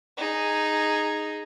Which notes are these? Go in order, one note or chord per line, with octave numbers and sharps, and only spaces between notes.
D#4 G#4